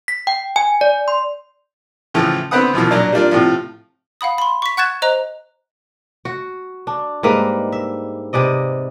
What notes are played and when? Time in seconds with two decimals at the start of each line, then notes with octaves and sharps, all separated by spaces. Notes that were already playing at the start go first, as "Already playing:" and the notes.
0.08 B6
0.27 G5
0.56 G#5
0.81 D5
1.08 C6
2.14 A2 C#3 E3 F3 A3
2.51 D3 B3 C4 B4 F#5 D#6
2.73 F#2 B2 E3 F3
2.91 A#2 F#3 D4
3.13 G3 A#3 D4 F4
3.31 A2 C3 F3 F4
4.21 F5 F#5 B5 D#6
4.38 B5 C6
4.62 C#6 B6
4.77 F#5 C#6 F#6 G#6 A6 E7
5.02 C5 D#5 A#5 F#6 F7
6.25 F#4
6.87 D4
7.23 G#2 G3 A#3 B4
7.72 E5
8.33 C3 B4 D5 D#5